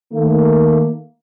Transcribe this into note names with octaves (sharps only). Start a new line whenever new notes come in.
D#3 A3 A#3